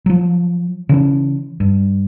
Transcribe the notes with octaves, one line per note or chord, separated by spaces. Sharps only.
F3 F#3
C#3 E3 C#4
G2